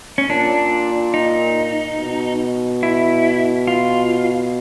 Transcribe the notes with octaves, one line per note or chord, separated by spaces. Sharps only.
C#4
A#2 D4
D#4
B2
E4
F4